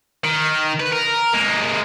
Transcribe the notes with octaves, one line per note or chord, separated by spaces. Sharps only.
D#3
B4
A#4
G#3 A#3